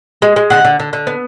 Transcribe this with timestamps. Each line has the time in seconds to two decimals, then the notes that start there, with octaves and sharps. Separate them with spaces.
0.22 G#3
0.36 G#3
0.50 D3 F#5
0.65 D3
0.80 D3
0.93 D3
1.07 B3